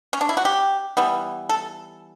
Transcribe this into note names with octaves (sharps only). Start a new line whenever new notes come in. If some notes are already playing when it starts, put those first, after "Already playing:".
C#4
D4
E4
F#4
G4
E3 G3 B3
A4